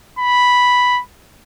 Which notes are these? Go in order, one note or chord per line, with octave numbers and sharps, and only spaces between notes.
B5